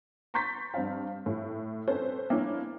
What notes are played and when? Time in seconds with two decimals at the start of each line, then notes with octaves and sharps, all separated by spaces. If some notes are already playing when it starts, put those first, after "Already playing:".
0.34 A#5 C6 C#6 G6 A6 B6
0.74 G2 C4 F5
1.26 A2
1.88 C4 C#4 A4 B4 C5
2.30 A#3 C#4 D4 E4